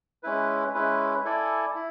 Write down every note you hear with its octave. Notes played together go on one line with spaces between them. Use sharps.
G#3 C#4 E4 B4
G#3 C#4 E4 B4
E4 A4 D5 G#5
E4